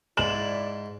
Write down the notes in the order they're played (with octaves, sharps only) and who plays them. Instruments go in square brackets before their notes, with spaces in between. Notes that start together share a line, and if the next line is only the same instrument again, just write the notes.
[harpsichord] G#2 [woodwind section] E4 D5 [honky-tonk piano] E7 F#7